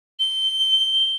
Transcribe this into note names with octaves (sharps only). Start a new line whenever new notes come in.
G7